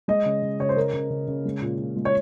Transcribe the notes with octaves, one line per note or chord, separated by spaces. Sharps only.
G#3 D#5
C#3
C#3
C#3 C#5
C5
C#3 A#4
C#3
C#3
C#3
G#3
A#2
A#2
G#3
C#5